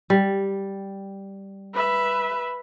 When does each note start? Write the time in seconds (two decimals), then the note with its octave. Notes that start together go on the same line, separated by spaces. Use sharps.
0.10 G3
1.74 B4 E5